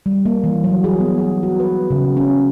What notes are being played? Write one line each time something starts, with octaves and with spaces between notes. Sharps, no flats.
G3
A#3
E3
F#3
G#4
B3
G#4
F#4
B4
C#3
C#4